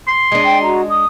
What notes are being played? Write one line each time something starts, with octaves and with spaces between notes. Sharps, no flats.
C6
G#3 D4
G5
F#4 A#5
D#6